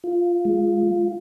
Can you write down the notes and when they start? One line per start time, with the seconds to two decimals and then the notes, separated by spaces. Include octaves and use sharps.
0.04 F4
0.45 G#3